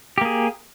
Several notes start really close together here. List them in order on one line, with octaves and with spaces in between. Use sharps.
G4 A#3 G#4